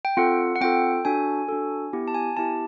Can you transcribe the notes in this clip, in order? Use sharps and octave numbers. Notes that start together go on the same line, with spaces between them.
G5
C4 F4 A4 F#5
F#5
C4 F4 A4 G5
D4 F#4 A4 G#5
D4 F#4 A4
B3 E4 G4
A5
G#5
B3 E4 G4 A5